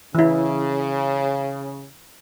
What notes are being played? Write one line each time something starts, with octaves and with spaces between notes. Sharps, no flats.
C#3 E3 E4